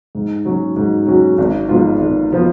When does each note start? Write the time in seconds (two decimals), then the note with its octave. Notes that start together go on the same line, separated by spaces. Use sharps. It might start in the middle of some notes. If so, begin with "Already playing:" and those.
0.15 G#2
0.45 F#3 C#4 F#4
0.76 G#2
1.07 F#3 C#4 F#4
1.38 G#1
1.69 G#2 F3 B3 F4
2.00 G#1
2.32 F3 B3 F4